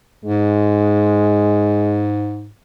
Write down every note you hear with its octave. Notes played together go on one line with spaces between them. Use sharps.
G#2 G#3